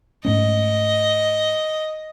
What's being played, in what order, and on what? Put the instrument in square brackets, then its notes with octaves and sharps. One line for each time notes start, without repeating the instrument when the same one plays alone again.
[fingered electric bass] G#2 A3 C#4 [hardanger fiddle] D#5